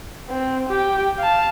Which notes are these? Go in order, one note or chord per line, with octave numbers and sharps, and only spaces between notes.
C4
G4 G5
F5 A5